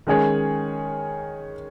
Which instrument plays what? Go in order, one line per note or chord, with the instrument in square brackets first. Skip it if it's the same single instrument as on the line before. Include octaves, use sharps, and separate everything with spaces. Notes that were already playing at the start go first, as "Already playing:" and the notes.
[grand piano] D#3 G#3 C#4 G#4 C#5